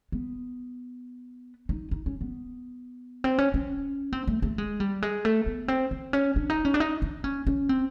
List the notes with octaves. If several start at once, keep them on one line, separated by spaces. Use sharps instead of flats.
B3
D#4
D#4
C#4
B3
C4
C#4
C#4
C4
A3
A3
G#3
G3
G#3
A3
B3
C4
C4
C#4
D4
D#4
C#4
D4
D#4
D4
C#4
C#4
C4